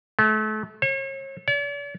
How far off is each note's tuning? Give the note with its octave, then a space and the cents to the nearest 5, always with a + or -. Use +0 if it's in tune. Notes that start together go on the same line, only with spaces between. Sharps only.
A3 -35
C#5 -40
D5 -45